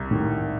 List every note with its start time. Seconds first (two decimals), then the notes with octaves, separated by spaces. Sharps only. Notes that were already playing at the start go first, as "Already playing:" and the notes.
Already playing: C2
0.11 A2 D#3